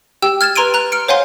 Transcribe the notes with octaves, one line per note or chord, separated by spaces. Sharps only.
G4 G5 E6
F6 G#6 A6 E7
B4 A#5 C6 G#6 D7 D#7
A#5 F#6
F6 C#7 D7
C5 C#5 F5 F#5 G#5 C6